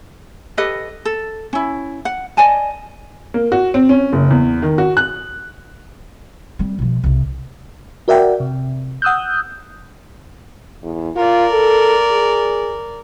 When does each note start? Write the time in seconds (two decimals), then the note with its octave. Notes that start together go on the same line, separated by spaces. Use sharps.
0.57 G4 A4 B4 D#5
1.05 A4
1.53 C#4 E4
2.05 F#5
2.37 D5 D#5 G#5 A5
3.34 A#3
3.52 F#4
3.74 C4
3.89 C#4
4.13 F#1
4.31 E2
4.62 D#3
4.78 F#4
4.97 F#6
6.59 G3 C4
6.79 B2 F3
7.04 C2 C#3
8.08 F#4 A#4 D5 E5 F#5 G5
8.40 C3
9.02 F#5 D#6 E6 F#6 G6
10.83 E2
11.16 F4 A#4 D5
11.52 A4
12.11 G#4